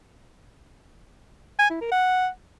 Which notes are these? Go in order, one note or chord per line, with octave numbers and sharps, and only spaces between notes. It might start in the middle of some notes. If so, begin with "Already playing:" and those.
G#5
E4
A#4
F#5